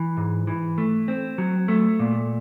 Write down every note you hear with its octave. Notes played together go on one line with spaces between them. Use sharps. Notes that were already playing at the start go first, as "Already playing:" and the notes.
Already playing: E3
G#2
E3
A3
C4
F#3
A3
A#2